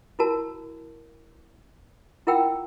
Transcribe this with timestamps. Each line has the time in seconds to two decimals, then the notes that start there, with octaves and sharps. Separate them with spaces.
0.19 E4 F#4 A#4 A5
2.27 E4 F4 A#4 F#5 G5 E6